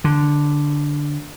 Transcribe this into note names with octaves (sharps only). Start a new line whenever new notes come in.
D3